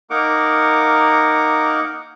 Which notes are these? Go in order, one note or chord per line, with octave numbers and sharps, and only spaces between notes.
A#3 D#4 A#4 F#5 D6